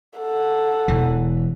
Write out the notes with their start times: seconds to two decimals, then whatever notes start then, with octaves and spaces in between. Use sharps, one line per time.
0.18 A4 F#5
0.88 E1 E3